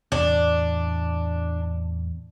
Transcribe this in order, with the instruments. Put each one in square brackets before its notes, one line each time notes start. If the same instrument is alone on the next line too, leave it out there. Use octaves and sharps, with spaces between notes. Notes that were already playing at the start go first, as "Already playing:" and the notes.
[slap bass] E2 A2 C3 [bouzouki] D4